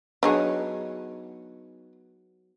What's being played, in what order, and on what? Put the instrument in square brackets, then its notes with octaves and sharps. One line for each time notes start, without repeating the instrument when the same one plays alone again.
[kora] F#3 B3 D#4 [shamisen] D4 G#4 C#5